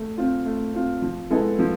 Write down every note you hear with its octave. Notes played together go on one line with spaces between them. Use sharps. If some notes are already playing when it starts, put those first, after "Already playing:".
Already playing: A3
C4 F4
A3
C4 F4
F3
G#3 B3 E4 A4
F3